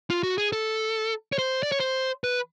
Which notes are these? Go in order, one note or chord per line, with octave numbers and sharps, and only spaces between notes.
F4
F#4
G#4
A4
C#5
C5
D5
C#5
C5
B4